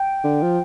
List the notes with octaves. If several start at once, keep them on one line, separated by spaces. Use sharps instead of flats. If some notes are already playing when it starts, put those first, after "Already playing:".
Already playing: G5
D3
F3